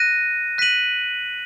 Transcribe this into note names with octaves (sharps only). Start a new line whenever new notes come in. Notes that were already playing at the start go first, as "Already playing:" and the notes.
Already playing: F#6 A#6 D#7
F#6 B6 D#7 F#7